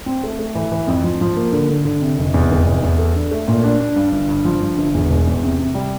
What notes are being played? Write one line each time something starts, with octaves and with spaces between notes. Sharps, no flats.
C4
A3
A3
E3
E3
F2
F3
F3
A#3
D3
D3
D3
C3
F1
E2
F1
E2
E2
A4
D4
A3
A#2
D4
D4
G2
G1
G2
F3
G2
G1
E2
E1
E2
C3
C3
G3